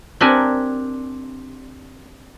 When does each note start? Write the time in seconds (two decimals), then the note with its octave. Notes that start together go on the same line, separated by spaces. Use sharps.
0.21 C4 D4 G4 A#4 F#5 G#5